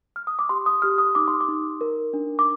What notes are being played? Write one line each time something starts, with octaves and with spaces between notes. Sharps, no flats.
F6
D#6
D6
G4 C6
D#6
G4 F6
D#6
D#4 D6
C6
D6
D#4
A#4
D4
D6